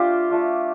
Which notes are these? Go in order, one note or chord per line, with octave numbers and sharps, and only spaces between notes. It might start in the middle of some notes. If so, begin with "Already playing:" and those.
Already playing: A3 D4 F4 G4
A3 D4 F4